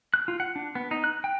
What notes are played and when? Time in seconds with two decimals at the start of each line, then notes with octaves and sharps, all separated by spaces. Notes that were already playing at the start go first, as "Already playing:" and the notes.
0.14 F#6
0.28 F4
0.40 F#5
0.56 D4
0.75 B3
0.91 D#4
1.04 F#6
1.24 G5